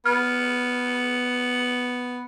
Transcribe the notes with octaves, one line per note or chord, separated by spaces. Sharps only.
B3 F6